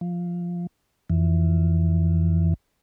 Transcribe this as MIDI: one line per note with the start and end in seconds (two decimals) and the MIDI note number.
0.01 0.67 53
1.10 2.54 41
1.10 2.54 52